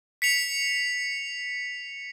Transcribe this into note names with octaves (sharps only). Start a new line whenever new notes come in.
B6 C#7 F7